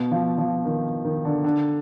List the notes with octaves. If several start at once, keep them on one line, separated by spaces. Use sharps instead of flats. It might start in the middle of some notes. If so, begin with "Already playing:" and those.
Already playing: B2
F3
F3
D#3
D#3
D3
D3